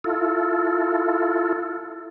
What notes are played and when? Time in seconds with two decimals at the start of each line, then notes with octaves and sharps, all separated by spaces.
0.04 E4 F4 A4